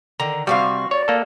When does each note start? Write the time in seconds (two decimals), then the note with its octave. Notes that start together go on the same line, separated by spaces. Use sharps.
0.20 D3 D#3 A#5
0.47 C3 G3 F#4 G4 F5 C#6
0.91 C#5 D5
1.08 A#3 A4